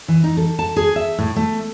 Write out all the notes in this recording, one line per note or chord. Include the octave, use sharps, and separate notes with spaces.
E3
D#4
A4
A5
G#4
E5
A2
A3